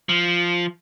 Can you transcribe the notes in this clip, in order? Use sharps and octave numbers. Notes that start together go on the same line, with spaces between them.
F3